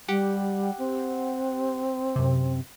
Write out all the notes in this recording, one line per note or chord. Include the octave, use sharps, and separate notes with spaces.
G3 G4 F#5
C4
F#2 C3